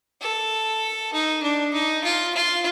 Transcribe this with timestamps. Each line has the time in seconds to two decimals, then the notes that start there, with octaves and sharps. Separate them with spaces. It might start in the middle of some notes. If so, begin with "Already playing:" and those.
0.21 A4
1.13 D#4
1.43 D4
1.73 D#4
2.04 F4
2.34 F4